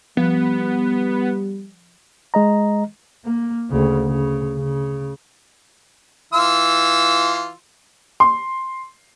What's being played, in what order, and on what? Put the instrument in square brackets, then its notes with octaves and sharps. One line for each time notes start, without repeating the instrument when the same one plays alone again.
[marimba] F3 [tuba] G3 [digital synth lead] B3
[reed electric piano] G#3 D#5 A#5
[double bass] A#3
D2 C#3
C#3
C#3
[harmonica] E3 F4 E6
[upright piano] C6